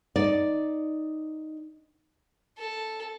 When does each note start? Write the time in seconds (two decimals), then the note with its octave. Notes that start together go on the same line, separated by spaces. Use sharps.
0.16 D#4 D5
2.58 A4